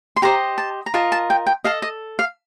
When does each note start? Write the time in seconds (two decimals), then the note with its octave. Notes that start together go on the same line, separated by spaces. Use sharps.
0.16 C6
0.22 G4 C5 D#5 A#5
0.58 A5
0.86 A#5
0.94 F4 A#4 D#5 A5
1.12 A5
1.30 G5
1.47 G5
1.64 A4 D#5 F5
1.82 D#5
2.19 F5